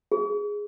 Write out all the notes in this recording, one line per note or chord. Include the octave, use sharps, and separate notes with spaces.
G#4